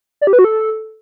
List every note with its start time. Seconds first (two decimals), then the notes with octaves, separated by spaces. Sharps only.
0.21 D5
0.27 G4
0.33 B4
0.39 F#4
0.44 A4